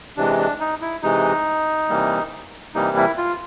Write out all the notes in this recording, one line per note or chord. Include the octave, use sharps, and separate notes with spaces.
C3 E3 G#3 D4
D4
D#4
E4
C3 E3 G#3 D#4
C3 E3 G3 A#3
C3 E3 G3 A#3 D#4
E4
F4